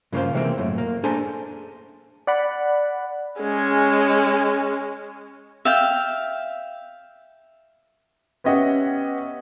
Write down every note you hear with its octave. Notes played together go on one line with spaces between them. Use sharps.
G2 C#3 A#3 D4 F4 C5
C3 E3 G#3 A#3 C4
F#2 A2
A#3
D4 G#4 A4 C5 G#5 A#5
D5 F#5 B5
G#3 C#4
E5 F5 G5
B3 C#4 G4 D#5 E5 F#5